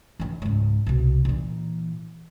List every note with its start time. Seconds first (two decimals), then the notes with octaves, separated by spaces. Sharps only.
0.19 D#3 E3
0.42 C#2 G#2
0.86 C2 B2
1.25 A#2 E3